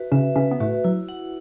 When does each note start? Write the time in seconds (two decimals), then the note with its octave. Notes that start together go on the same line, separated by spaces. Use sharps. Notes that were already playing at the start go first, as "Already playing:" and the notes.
Already playing: F#4 B4 E5
0.12 C#3 C#4 E5
0.36 C#3 C#4 B4
0.51 B3
0.60 A2 A3 F#4
0.84 F#3 E4
1.09 F#5